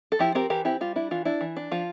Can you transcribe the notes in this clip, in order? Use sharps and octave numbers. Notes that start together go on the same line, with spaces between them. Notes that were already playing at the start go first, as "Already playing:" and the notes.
A4
F3 E4 G4
C4 G4 A#4
E3 G4 A#4
C4 E4 G4
G3 F4
D4 E4
E3 F4
D4 E4
E3
D4
F3 F4